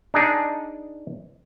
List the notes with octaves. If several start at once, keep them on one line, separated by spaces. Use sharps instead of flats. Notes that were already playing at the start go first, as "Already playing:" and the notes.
D4 D#4 G#4 D5